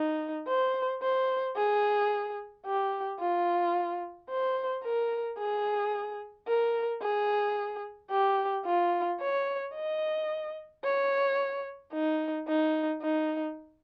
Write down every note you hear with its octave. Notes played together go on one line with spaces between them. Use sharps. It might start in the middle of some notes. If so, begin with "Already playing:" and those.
Already playing: D#4
C5
C5
G#4
G4
F4
C5
A#4
G#4
A#4
G#4
G4
F4
C#5
D#5
C#5
D#4
D#4
D#4